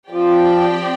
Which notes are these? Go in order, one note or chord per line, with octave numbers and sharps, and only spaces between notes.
F3 C4 G4 D5 G5